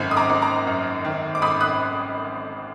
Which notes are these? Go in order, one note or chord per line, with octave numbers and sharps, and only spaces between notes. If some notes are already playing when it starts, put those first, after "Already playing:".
Already playing: G#1 F#2 D#3
D#6
A#5 D6
G#1
A#5 D6
F#2
D#3
D6
G#1 B5 D#6
D#6 F#6